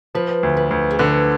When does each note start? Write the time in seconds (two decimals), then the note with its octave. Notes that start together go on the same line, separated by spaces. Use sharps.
0.15 F3 B4
0.43 D2
0.57 B4
0.71 D2
0.91 G#4
0.99 D3 B4